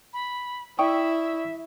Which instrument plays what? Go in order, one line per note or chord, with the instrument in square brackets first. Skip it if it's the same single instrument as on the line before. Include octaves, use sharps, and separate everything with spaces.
[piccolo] B5
[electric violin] E4 [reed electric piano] D5 C#6 D#6 [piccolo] E5 [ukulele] G5